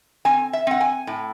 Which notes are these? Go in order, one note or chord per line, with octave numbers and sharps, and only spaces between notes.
C4 G#5
E5
C4 F#5
G#5
A2